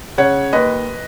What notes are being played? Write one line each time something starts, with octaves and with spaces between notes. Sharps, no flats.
C#3 C#5 F#5
D#2 B4 D#5